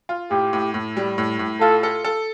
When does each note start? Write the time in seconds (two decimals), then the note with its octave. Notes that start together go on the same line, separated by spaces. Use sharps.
0.09 F4
0.31 A2 G4
0.53 A2
0.74 A2
0.97 G3
1.18 A2
1.39 A2
1.61 F4 A4
1.83 A4
2.04 A4